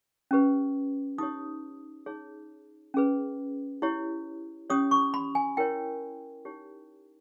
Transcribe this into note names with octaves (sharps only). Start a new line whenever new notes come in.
C#4 G4 B4
D#4 G4 C#5 D#6
D#4 G#4 C#5
C#4 G#4 B4
E4 G4 C#5
C#4 G4 C#5 D#6
C#6
B5
G#5
E4 A#4 C#5 G5
D#4 G4 C#5